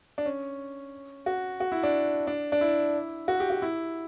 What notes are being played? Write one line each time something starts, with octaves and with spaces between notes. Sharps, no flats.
D4
C#4
F#4
F#4
E4
D4
D4
D4
E4
F#4
G4
F#4
E4